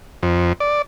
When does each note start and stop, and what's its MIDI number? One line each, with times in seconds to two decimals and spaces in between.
0.23 0.53 41
0.60 0.82 74